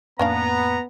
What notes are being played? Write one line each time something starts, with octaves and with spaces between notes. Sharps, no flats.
F2 A2 A#3 B3 C#4 D4 F5 A#5